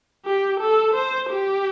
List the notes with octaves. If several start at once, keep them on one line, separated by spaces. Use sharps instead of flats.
G4
A4
C5
G4